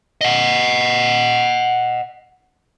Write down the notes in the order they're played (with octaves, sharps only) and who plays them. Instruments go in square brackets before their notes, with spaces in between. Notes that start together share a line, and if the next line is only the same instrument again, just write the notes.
[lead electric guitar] D#5 F#5